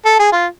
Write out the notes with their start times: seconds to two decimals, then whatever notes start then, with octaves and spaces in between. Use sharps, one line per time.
0.05 A4
0.19 G#4
0.32 F4